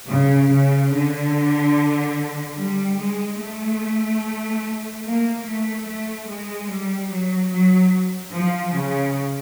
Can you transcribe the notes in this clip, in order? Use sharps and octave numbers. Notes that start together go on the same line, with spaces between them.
C#3
C#3
D3
G3
G#3
A3
A#3
A3
A3
G#3
G3
F#3
F#3
F3
C#3